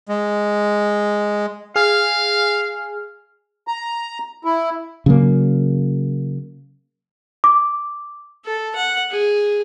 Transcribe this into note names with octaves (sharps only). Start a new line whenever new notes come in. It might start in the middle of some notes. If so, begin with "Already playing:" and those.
G#3
G#4 F5 G#5 F6
A#5
E4
C#3 F#3 A#3
D6
A4
F#5
G#4